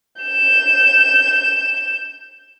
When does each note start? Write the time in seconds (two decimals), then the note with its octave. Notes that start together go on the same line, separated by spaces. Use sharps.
0.22 G6 E7